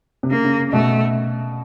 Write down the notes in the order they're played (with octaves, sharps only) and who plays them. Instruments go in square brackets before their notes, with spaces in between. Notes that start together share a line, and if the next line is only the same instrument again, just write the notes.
[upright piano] C3
[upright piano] C#3 [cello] A#3
[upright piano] C#3
[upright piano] B2 [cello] A3